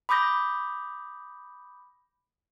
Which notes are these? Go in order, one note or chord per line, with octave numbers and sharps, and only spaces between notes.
B5 D6 D#6 G6 A#6